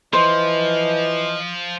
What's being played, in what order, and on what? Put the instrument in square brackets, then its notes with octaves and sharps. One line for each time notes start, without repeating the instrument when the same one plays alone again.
[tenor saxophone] E3 [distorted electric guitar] F3 [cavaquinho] C5 [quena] D#5